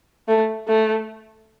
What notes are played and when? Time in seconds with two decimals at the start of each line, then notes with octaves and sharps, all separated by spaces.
0.28 A3
0.67 A3